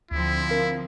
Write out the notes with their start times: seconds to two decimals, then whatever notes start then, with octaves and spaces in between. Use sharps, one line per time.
0.11 D2 D3 F3 C4 E4
0.49 A#4 F5